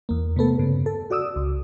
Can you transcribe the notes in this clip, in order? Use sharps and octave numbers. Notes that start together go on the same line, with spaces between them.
E2 A#3
C3 A3 B3 A4
G2 C#3
A4
F#4 D5 D#6 E6
C#2